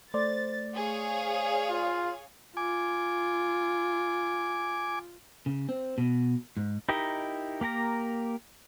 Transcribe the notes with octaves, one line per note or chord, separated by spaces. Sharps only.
A3 C5 D5 A6
G#4 C#5 F5
F4
F4 G#5 D6
C#3
C4
B2
G#2
D#4 E4 G4 A#4 D#5
A#3 G4 A#4 A#5